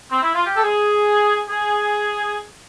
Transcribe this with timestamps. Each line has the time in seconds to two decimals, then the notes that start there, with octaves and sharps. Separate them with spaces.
0.10 C4
0.23 E4
0.34 F4
0.46 G4
0.56 A4
0.63 G#4
1.49 G#4